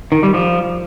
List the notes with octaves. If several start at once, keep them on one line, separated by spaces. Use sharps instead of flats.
D#3
G3
F3